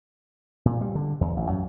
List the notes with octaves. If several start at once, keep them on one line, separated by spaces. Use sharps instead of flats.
A#2
G3
D3
E2
A1
F#2